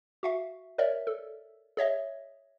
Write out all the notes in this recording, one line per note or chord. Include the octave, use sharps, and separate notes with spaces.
F#4 E5 F5
A#4 C#5 D5 E5
A4
G#4 C#5 D#5 E5